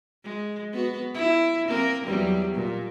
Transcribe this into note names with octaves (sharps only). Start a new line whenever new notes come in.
G#3
B3 F#4
E4
A#3 C4 A#4
E2 F#3 G3
A#2